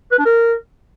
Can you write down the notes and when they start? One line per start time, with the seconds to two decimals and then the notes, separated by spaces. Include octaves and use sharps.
0.12 B4
0.19 D4
0.25 A#4